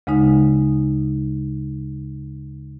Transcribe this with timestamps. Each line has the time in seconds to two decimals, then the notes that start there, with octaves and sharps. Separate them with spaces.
0.07 D2 C#3 G#3 D#4